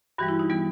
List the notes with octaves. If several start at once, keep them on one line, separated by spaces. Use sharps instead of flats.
G2 E3 G3 F#4
E4
D#4
E3 G3 B3